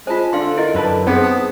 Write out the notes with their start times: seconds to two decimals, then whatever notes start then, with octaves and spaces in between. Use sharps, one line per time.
0.07 G#3 F4 C5 G#5 A5 B6
0.33 D3 D4 A4 D5 F5 C6
0.57 E4 G4 A#4 D#5
0.74 F#2 D4 B4 A5
1.07 B3 C4 D#4 G#4 C5
1.23 A5 D#6